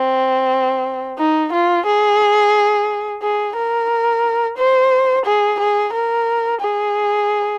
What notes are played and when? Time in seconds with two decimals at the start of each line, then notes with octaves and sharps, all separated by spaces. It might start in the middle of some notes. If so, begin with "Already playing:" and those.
Already playing: C4
1.18 D#4
1.53 F4
1.86 G#4
3.22 G#4
3.56 A#4
4.57 C5
5.25 G#4
5.60 G#4
5.93 A#4
6.61 G#4